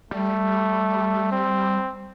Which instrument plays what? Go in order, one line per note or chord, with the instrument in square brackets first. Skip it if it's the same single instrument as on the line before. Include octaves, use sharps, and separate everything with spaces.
[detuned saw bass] G3 [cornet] A3
[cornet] C4